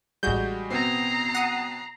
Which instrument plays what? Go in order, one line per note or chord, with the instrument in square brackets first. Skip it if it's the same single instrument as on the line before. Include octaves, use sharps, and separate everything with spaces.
[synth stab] A1 G6 [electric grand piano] G3 G#3 F#4
[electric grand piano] B2 B3 C4 [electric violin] A#5 C7
[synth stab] F#5 D#6